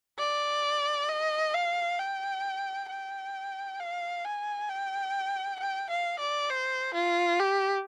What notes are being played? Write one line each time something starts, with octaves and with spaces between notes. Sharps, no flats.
D5
D#5
F5
G5
G5
F5
G#5
G5
G5
F5
D5
C5
F4
G4